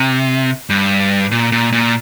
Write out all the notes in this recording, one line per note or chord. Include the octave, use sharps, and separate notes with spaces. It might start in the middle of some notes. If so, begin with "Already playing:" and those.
Already playing: C3
G2
A#2
A#2
A#2